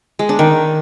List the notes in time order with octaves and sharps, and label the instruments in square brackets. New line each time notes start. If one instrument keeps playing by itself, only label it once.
[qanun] G#3
D4
D#3